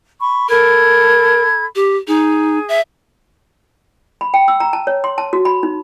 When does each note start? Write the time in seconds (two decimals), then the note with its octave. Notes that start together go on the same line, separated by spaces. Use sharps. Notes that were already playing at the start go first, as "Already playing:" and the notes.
0.20 B5 C#6
0.49 A4 A#4 B5 G#6
1.75 G4
2.08 D#4 G#4
2.69 E5
4.21 B5
4.34 G5
4.48 E6
4.60 A#5
4.73 A5
4.87 C#5
5.04 C6
5.18 A5
5.33 F#4
5.45 B5
5.63 D#4